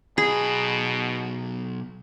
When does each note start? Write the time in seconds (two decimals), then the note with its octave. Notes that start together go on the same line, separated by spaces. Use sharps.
0.18 B1 B2 G#4 B5